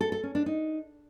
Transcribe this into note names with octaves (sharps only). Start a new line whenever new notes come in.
A4
A4
C#4
D4
D#4